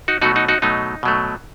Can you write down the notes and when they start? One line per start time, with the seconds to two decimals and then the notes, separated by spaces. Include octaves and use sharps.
0.08 D#4 F#4
0.22 B2 F#3 A3 D#4 F#4
0.36 D#4 F#4
0.48 D#4 F#4
0.62 B2 F#3 A3 D#4
1.03 B2 F#3 A3